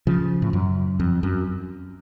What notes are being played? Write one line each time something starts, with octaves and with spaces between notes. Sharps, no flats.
C#3 F3
A2
F#2
F2
F#2